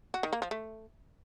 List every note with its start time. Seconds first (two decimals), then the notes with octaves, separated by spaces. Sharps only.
0.14 F#4
0.23 D#3
0.33 A#3
0.42 F3
0.51 A3